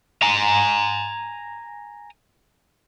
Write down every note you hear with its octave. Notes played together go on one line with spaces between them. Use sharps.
G#5 A#5